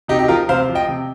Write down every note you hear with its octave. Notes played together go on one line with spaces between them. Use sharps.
C3 D#4 G4
D#4 G4
F3 F4 A#4
C3 C5 F5
F3
D#5 G5
C3